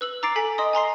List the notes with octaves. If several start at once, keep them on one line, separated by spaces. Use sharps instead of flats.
B4 E6 F#7
A#5 D6 A6 C7 D7
A4 G#5 B6 D7
D#5 C6 D#6
G#5 A#5 C6 C7